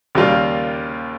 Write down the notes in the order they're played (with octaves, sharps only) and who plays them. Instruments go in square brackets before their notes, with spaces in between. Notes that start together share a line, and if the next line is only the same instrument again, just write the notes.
[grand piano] D#2 C#3 G3 A#3 F4